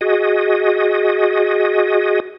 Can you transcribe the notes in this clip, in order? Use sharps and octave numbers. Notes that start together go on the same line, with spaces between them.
F#4 G#4 D#5